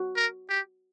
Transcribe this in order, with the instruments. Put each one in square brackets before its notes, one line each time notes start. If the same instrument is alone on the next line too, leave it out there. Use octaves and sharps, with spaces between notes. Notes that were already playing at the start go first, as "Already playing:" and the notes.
Already playing: [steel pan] F#4
[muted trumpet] A#4
G4